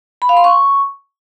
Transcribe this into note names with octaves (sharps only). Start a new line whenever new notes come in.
B5
F5
C6
C#6